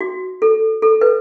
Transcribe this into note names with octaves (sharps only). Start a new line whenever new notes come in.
F#4
A4
A4
B4